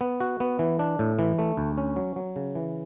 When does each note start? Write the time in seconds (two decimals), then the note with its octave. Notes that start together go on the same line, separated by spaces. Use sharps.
0.01 B3
0.20 F#4
0.40 B3
0.59 E3
0.79 D4
0.99 A2
1.19 E3
1.38 A3
1.57 D2
1.77 C#4
1.96 F#3
2.16 F#3
2.36 C#3
2.55 E3